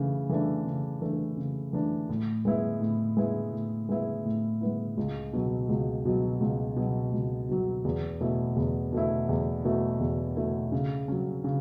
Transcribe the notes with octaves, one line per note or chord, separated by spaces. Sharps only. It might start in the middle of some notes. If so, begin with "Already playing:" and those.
Already playing: C#3 E3 A3
E3 A3 D4
C#3
E3 A3 D4
C#3
E3 A3 D4
A2
G#3 B3 E4
A2
G#3 B3 E4
A2
G#3 B3 E4
A2
G#3 B3 E4
C#2
B2 F#3
C#2
B2 F#3
C#2
B2 F#3
C#2
B2 F#3
E2
B2 A3 E4
E2
B2 A3 E4
E2
B2 A3 E4
E2
B2 A3 E4
C#3
F#3 C#4
C#3